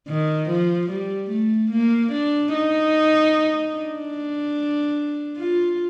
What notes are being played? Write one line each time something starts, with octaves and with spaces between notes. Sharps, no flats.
D#3
F3
G3
A3
A#3
D4
D#4
D4
F4